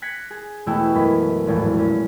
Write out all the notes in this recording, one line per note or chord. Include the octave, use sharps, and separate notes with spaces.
F#6 G#6 A#6 B6 C#7
G#4
E1 B2 A3 E4 G5 E6
F#2 E3 D#5 B5
G#1 E2 A2 E3 F3
A#2 C#4